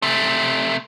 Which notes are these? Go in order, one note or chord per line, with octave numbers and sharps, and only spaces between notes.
C3 A3